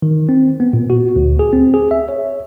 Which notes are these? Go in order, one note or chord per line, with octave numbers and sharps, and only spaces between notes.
D#3
C4
B3
A#2
F#4
D2
G#4
C4
G#4
E5
C#5